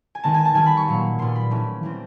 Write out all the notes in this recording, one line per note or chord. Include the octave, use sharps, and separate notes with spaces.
G#5
D#3 G#3 B3 A5
G#5
A5
D#3 G3 B3 G#5
B5
C#6
A#2 F#3 A#3
A#2 G3 B3 C6
B5
E3 A3 C#4
E3 G3 C4